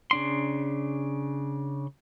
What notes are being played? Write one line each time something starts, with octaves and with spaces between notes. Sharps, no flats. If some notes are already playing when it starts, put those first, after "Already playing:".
C#3 D4 C6